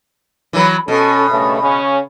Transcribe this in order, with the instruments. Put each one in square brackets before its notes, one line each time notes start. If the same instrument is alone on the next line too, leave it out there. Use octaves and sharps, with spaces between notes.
[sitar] E3 F#3 B4
[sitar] B2 [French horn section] C#4 A4
[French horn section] G2 C#3 A3
C#3 C#4